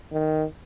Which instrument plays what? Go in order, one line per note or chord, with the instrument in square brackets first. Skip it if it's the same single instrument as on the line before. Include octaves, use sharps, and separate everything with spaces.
[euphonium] D#3